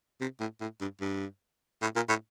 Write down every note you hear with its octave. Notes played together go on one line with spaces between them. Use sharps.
C3
A2
A2
G2
G2
A2
A#2
A2